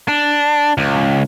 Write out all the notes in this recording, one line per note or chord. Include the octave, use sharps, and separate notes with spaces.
D4
C#2